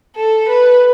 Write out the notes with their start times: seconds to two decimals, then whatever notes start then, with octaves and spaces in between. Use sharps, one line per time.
0.15 A4
0.49 B4